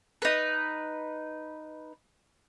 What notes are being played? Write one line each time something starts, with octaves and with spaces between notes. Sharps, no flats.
D#4 B4